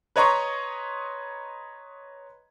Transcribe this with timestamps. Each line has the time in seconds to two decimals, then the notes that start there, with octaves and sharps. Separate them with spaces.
0.16 B4 C#5 D#5 A#5 C6 C#6